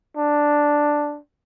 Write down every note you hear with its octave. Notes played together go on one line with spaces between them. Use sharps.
D4